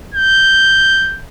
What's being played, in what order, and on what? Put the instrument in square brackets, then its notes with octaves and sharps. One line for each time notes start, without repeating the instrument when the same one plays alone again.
[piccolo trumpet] G6